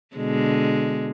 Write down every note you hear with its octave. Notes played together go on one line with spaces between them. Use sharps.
B2 D3 G#3